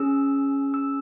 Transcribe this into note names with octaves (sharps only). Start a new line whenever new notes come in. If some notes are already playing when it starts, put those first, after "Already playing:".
Already playing: C#4 G#4 E6
E6